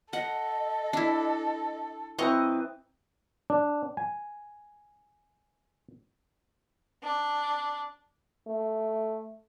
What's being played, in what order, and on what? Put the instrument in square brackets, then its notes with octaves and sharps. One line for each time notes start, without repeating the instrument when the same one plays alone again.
[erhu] A4 [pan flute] D#5 [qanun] F#5
[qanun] D4 E4
[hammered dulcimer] E3 C4 B4 [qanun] D#5 A#5 C#6
[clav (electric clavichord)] D4
G#5
[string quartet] D4
[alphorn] A3